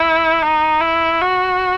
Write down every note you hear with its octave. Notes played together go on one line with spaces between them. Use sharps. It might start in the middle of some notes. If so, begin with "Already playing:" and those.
Already playing: E4
D#4
E4
F#4